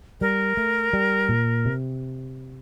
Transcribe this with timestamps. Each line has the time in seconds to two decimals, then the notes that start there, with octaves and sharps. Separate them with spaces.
0.21 G3 A#4
0.57 A3
0.93 G3
1.29 A#2
1.65 C3